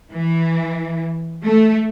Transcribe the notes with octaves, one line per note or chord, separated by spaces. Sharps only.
E3
A3